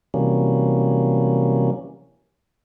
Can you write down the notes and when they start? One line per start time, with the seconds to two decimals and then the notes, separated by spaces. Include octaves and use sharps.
0.14 C3 E3 F#3 G3 A#3 C#4